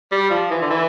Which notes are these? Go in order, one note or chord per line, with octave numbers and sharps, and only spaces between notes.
G3
F3
E3
D3
E3